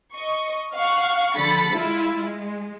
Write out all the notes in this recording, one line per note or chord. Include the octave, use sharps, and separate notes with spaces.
D#5 C#6
F5 F#5 C#6
D3 F3 B5 A6 B6 C#7
G#3 E4 F4
G#3